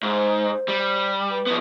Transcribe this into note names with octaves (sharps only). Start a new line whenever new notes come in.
G#2 C5
G3
B4
F3 B3